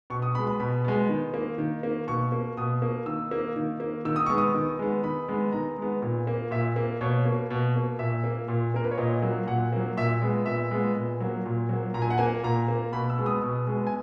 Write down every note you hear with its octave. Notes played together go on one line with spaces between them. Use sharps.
B2 C#6
D#6
G#3 B3 B5
B5
B2 B5
G#3 B3
D#3
A#3
D#3
A#3
B2 C#6
A#3
B2 D#6
A#3
D#3 E6
A#3
D#3
A#3
D#3 E6
D#6
G#3 B3 C#6
D#6
D#3
G#3 B3
D#3 B5
G#3 B3
D#3 A#5
G#3 B3
A#2
A#3
A#2 E5
A#3
B2 C#5
A#3
B2
A#3
A#2 E5
A#3
A#2
A#3 A#4
B4
C#5
A#2 D#5
F#3 A#3
A#2 F#5
F#3 A#3
A#2 E5
G#3 B3
A#2 E5
G#3 B3
A#2
F#3 A#3
A#2
F#3 A#3
A#2 A#5
G#5
F#5
A#3 G#5
A#2 A#5
A#3
B2 B5
E6
G#3 B3
D#6
B2
G#3 B3
G#5